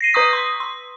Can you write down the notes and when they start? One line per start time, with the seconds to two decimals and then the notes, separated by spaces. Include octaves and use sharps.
0.01 A#6 C7 D#7
0.14 B4 A#5 C#6 D#6 B6
0.33 C6
0.60 C6